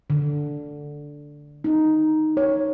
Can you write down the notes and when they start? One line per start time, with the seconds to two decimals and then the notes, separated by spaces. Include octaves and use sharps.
0.10 D3
1.64 D#4
2.37 C#5